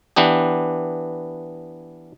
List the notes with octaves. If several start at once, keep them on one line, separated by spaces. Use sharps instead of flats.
E3 B3 D4 G4